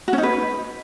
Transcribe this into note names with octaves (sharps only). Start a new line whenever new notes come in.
F#4
C#4
D#4
B4